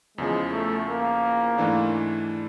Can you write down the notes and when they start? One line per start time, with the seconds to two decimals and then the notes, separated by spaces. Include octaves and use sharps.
0.17 E2 C#3 F3 G#3
0.52 A3
0.89 A#3
1.58 G#2 E3 A3 D4